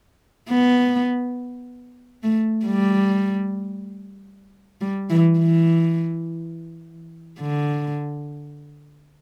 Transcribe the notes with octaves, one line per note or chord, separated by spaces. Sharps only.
B3
A3
G3
G3
E3
E3
D3